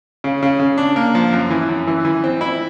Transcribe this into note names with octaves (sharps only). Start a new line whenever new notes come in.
C#3
C#3
C#3
D4
A#3
F3
F#2
E3
F#2
E3
E3
C4
E4